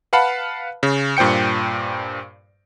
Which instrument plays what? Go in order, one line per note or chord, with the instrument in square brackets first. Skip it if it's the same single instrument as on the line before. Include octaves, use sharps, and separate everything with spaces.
[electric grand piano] B4 F5 F#5 A5 B5
C#3
G2 A#2 C5 G5 C#7